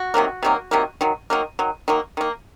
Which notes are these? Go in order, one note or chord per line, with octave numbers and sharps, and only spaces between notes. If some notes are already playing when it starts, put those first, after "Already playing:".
Already playing: F#4
C3 D#3 F#3 A#3
C3 D#3 F#3 A#3
C3 D#3 F#3 A#3
D#3 F#3
D#3 F#3 A#3
D#3 F#3
D#3 F#3 A#3
D#3 A#3